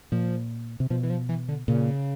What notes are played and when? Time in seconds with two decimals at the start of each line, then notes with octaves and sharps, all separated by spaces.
0.12 A#2 F3
0.80 C3
0.90 B2 F3
1.03 E3
1.10 F3
1.29 E3
1.49 D3
1.68 A#2 C#3